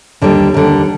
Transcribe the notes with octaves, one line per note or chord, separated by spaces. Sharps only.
D#2 D3 G3
D#2 D3 G3